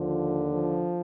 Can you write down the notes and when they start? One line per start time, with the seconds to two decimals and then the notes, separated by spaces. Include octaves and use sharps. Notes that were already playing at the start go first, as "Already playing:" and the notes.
Already playing: D#2 D3 F3
0.51 F3